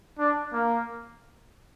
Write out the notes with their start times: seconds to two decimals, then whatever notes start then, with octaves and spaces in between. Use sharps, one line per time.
0.18 D4
0.53 A#3